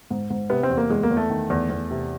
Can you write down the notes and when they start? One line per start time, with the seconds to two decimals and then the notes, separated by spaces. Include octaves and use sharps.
0.11 G#2
0.30 G#2
0.50 C3 B3
0.63 C4
0.70 E2
0.78 A#3
0.90 E2 G#3
1.03 A#3
1.11 E2
1.17 A3
1.30 D#3
1.50 E2
1.70 E2
1.91 C3